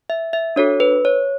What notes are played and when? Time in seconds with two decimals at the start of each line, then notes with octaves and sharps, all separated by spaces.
0.10 E5
0.33 E5
0.56 D4 F#4 A4 C#5
0.80 B4
1.05 C#5